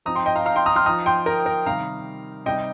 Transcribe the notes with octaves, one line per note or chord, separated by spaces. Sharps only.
F3 C4 D#4 A#5 D#6
G5 C6
D#5 G5
F5 A#5
F5 A#5
G5 C6
A#5 D#6
C6 F6
F3 D#4 A#5 D#6
G5 C6
A#4
A#4
C3 D#3 G3 F5 A#5
C3 G3 D#4 D#5 G5